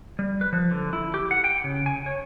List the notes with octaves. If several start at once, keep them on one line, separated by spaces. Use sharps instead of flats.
G3
B4
F3
D3
E4
G4
F#5
G5
C#3
G#5
C#5